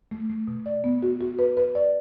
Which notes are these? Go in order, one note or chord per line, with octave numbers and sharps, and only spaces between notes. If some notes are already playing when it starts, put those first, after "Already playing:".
A3
A3
B2
D5
B3
F#4
F#4
B4
B4
D5